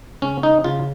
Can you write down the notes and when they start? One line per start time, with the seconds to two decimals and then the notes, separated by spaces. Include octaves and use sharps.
0.22 C#3 C#4
0.43 D#4
0.64 C#3 F4